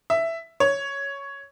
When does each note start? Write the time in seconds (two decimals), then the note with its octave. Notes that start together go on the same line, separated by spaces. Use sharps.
0.10 E5
0.60 C#5